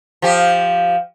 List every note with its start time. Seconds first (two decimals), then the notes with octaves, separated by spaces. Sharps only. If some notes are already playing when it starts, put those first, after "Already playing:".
0.22 F3 G4